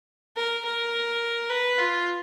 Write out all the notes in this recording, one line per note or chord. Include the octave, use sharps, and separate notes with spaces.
A#4
A#4
B4
F4